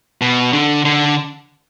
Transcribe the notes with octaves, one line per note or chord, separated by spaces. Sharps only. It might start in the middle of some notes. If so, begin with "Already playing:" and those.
B2
D3
D3